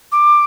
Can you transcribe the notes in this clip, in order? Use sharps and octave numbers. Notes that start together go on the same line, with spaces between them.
D6